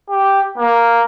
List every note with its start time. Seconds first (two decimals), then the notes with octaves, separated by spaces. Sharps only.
0.10 G4
0.58 A#3